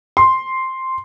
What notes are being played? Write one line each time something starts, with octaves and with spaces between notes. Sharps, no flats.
C6